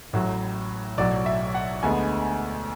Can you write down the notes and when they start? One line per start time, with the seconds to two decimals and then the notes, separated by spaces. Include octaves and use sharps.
0.13 A1 A2 F#3
0.98 B1 A2 F#3 D5
1.26 E5
1.54 F#5
1.83 D2 D3 G#3 B3 G#5